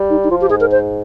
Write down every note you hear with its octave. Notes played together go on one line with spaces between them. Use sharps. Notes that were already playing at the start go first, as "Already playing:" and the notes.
Already playing: G3
D#4
D#4
F3 F4
G4
G#2 G#4
A#4
C5